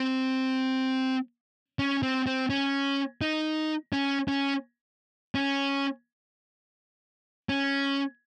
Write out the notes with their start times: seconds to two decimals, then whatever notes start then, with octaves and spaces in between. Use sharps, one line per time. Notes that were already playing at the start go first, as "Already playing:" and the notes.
Already playing: C4
1.79 C#4
2.03 C4
2.27 C4
2.50 C#4
3.21 D#4
3.93 C#4
4.28 C#4
5.35 C#4
7.49 C#4